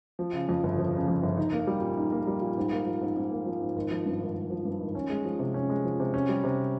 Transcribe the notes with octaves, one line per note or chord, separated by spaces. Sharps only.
F3
C#3
F2
G1
F3
C#3
F2
G1
D#4
A#3
G3
A#2
D#4
A#3
G3
A#2
G#2
A#3
F3
G#2
G#2
A#3
F3
G#2
G#1
F3
G2
G#1
G#1
F3
G2
G#1
C#4
G#3
F3
C3
C#4
G#3
F3
C3
C#4
G3
C3